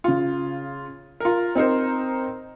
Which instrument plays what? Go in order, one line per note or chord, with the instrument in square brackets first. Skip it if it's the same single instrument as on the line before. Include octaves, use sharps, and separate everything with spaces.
[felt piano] C#3 F4
F4 A#4
C4 D#4 A#4 C5